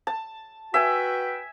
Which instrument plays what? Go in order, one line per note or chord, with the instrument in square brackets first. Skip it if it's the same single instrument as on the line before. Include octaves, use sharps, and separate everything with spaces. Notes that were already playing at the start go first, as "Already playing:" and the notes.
[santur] A5
[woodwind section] F#4 B4 G5 [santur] E5 G#5